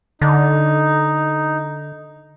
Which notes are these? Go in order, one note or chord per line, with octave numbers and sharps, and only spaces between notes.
D3 D#4